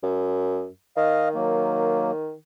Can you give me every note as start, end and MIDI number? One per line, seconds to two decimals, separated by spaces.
0.03 0.67 42
0.97 2.33 51
0.97 1.29 75
0.97 1.29 77
1.35 2.11 54
1.35 2.11 58